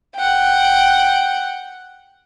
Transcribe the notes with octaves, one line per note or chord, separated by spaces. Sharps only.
F#5 G5